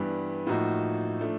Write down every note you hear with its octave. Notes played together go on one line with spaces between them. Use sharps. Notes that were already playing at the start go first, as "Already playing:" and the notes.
Already playing: G2 E3 G3 B3 D4
A2 F3 A#3 D#4 F#4
F3 A3 D4